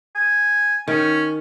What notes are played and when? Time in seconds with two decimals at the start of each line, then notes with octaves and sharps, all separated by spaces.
0.15 G#5
0.88 D#3 C#4